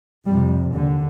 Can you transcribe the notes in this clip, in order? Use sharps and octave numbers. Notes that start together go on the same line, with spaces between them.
F2 C3 G3
D#2 D3